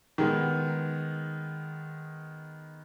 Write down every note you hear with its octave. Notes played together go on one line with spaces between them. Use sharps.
D#3 G#3 B3